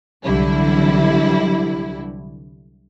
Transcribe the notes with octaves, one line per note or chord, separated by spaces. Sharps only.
C2 D3 E3 F#3 G3 E4